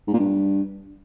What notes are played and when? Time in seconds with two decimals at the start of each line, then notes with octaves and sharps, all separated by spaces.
0.07 G#2
0.13 A#2
0.19 G2